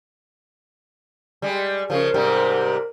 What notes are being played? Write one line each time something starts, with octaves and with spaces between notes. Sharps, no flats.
G3 G#3
C#3 F3 A#4
G#2 C3 G3